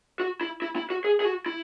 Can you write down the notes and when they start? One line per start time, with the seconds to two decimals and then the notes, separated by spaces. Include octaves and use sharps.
0.20 F#4
0.41 E4
0.62 E4
0.76 E4
0.90 F#4
1.04 G#4
1.20 G#4
1.25 F#4
1.46 E4